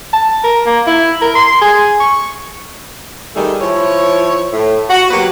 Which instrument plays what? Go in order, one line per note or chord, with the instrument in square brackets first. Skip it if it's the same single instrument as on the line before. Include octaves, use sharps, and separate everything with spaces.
[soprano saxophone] A5
A#4
A#3
E4
A#4
C6
G#4
C#6
[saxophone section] D#3 G3 A3 D#4 G#4
F3 E4 C#5
A2
F#4
F#3 A#3 B3 G4 B4